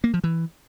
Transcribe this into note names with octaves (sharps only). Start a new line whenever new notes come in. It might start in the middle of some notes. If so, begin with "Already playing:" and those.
A#3
F3
E3